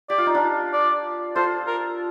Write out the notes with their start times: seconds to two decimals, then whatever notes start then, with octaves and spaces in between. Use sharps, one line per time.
0.10 G4 D5
0.18 F4
0.26 D#4
0.34 D4 F4
0.73 D5
1.36 F4 A4 C5
1.67 A#4